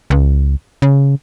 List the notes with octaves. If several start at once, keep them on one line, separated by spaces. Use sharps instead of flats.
C#2
C#3